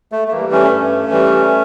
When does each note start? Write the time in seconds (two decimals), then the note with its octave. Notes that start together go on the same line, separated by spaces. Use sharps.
0.12 A3
0.28 A3
0.31 E3 G3 A#3
0.52 A3 C#4
0.72 G2
1.11 E3 G3